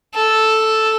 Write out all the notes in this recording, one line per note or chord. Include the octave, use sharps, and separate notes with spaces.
A4